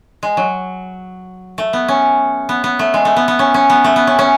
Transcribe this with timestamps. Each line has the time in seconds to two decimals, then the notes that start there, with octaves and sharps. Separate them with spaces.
0.23 G#3
0.37 F#3
1.58 A3
1.73 B3
1.88 C#4
2.49 B3
2.64 B3
2.79 A3
2.94 G#3
3.05 A3
3.16 B3
3.28 B3
3.39 C#4
3.54 C#4
3.70 B3
3.84 A3
3.96 B3
4.07 C#4
4.19 C#4